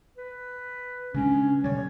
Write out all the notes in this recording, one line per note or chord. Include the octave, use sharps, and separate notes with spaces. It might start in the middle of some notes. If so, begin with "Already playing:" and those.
B4
C#3 G#3 C#4 D4
B2 D3 G3 C#5